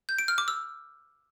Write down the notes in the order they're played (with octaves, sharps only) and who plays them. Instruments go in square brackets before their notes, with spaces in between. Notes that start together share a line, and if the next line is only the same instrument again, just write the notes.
[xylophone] G6
D7
F6
D6
E6